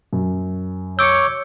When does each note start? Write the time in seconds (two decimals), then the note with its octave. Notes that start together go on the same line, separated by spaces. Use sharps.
0.13 F#2
0.99 C#5 D6 E6 G6 C#7